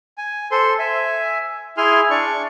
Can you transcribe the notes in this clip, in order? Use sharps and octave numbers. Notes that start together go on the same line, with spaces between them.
G#5
A4 C5 C6
E5 G#5
E4 G#4 G#5 C6 F6
D4 D5 C#6